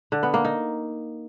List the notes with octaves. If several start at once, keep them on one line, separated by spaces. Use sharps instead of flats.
D3
B3
A#3
D#4